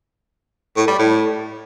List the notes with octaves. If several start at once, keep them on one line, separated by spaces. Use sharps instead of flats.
A2
G3
A2